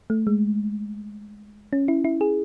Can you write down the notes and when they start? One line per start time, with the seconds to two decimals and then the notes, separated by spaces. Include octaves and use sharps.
0.10 A3
0.27 G#3
1.73 C#4
1.88 E4
2.04 E4
2.21 G#4